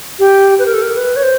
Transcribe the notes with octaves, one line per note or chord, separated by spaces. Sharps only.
G4
B4
A#4
A4
A#4
B4
C#5
C5